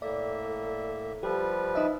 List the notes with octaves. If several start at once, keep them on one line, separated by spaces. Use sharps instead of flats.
A2 A#3 A4 D5 E5
F3 G3 G4 B4
D#4 D#5 E5